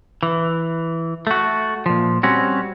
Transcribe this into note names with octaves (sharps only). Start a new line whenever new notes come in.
E3
A3 F#4
A#2 F3
G3 C4 C#4 F#4